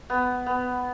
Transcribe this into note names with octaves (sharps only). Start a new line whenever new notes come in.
B3
B3